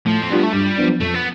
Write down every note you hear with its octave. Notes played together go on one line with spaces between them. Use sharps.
A2 F3
C4
G3 B3 D4 F4
A3
G2 G3
F3 B3 D4
F2 A3
B3